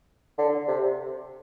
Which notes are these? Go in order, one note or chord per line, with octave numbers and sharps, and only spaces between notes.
D3
C3